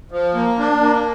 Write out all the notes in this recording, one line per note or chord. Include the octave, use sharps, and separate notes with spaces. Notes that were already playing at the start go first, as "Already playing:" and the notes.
F3
A#3
D4
A#3